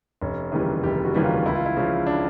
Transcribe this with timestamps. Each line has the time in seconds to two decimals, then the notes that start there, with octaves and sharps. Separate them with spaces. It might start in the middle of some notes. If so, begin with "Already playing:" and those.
0.22 F1 C#4
0.52 D#2 C#3 E3 G3
0.83 F1 G4
1.04 F#4
1.14 D#2 C#3 E3 G3
1.24 F4
1.45 C#2 E4
1.55 F4
1.66 E4
1.77 C#3 F3
2.06 D4